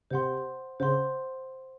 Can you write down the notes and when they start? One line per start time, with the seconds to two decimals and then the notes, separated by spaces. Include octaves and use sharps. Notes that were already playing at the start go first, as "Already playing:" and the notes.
0.10 C3 C5 F#5 C6
0.80 C#3 C5 F#5 C6